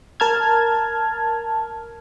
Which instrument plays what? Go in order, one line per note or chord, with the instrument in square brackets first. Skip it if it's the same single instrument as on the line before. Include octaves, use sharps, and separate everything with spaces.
[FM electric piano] A#4 A5 F6 G#6